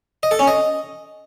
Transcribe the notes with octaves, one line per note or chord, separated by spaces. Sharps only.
D#5
A4
C#4
D#5